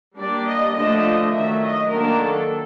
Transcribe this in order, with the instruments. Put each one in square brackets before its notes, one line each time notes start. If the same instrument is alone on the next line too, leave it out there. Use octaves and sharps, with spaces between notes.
[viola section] G3 A#3 D4 D5
D#5
D3 F3 A3 D4 D#5
D#5
D#3 F#3 A3 E5
D#5
D#3 F#3 A#3 D4 A#4
A4